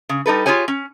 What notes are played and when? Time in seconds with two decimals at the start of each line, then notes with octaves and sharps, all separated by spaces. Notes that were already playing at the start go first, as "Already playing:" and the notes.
0.09 C#3
0.26 G3 D#4 A4 B4
0.46 F4 G4 G#4 C#5 G#5
0.68 C#4